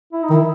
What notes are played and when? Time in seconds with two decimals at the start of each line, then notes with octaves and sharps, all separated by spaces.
0.13 E4
0.23 D#4
0.30 D#3
0.33 E4